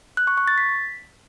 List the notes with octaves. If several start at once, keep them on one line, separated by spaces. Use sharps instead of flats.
F#6
C#6
C#6
A6
B6